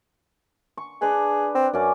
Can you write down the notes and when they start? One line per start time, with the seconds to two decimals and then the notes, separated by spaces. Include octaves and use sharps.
0.77 C#6
1.02 D4 G#4 B4
1.55 C4
1.73 F#2 C#4 D5